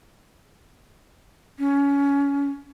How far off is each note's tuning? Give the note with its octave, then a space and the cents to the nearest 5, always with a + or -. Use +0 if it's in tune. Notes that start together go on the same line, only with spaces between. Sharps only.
C#4 +25